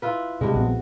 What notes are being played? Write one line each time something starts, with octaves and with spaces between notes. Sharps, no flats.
E4 F4 B4
G2 C3 G#3
A#1 B3 C4 F#4